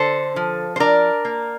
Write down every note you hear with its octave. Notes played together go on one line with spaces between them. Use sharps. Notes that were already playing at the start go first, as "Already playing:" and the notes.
Already playing: D3 A4 C5
F3
C5
D4 A#4 D5
A#3